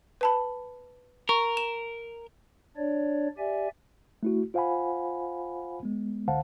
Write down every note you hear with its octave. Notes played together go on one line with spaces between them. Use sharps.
B4 A5 B5
A#4 C#6
E7
D4 C#5 D5
G4 D5 E5 G#5
A3 E4 F#4
F4 C5 F5 F#5 G#5 B5
G#3 B3
C#2 D3 C5 F5 F#5 A5